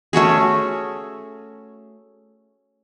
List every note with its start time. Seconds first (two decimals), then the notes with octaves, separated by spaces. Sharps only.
0.13 A3 C#4 F#4 G#4